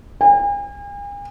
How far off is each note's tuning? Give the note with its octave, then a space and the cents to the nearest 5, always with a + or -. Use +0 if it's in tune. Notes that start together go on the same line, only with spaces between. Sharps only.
G#5 -45